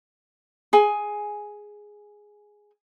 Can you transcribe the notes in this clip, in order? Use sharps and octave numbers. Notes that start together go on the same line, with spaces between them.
G#4 G#5